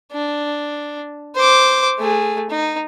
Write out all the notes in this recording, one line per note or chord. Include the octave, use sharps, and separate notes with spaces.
D4
C5 D6
A3 G#4
D#4